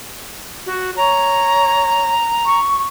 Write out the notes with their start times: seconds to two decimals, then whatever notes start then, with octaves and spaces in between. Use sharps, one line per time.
0.66 F#4
0.96 C#5 A#5
2.46 C#6